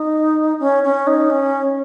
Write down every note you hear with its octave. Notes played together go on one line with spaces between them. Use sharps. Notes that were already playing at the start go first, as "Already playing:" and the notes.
Already playing: D#4
C#4
C#4
D#4
C#4